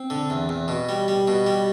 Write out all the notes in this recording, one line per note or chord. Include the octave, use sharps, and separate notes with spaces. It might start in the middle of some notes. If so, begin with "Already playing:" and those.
Already playing: C4
D3
E2
E2
B2
G3
G3
B2
G3